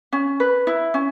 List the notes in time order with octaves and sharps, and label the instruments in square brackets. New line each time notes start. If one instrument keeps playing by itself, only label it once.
[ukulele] C#4
B4
E4
C#4